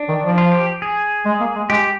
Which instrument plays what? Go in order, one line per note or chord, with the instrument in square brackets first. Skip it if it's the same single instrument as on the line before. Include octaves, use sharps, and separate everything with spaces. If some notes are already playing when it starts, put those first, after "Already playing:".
Already playing: [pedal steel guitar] D4
[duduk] D#3
F3
[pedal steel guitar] F4
G4
G#4
[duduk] G#3
A#3
G#3
[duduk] G#3 [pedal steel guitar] G4